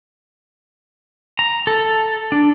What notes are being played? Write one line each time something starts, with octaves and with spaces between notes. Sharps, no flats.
A#5
A4
D4